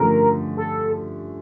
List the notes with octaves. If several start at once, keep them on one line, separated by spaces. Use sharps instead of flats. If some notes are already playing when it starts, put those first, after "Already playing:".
Already playing: G2 D3 F3 A3 C#4 A#4
A4